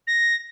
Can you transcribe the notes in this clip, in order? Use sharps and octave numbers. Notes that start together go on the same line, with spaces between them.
A#6